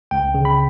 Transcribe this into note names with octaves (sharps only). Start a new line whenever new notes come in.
C#2 G5
C#3
B5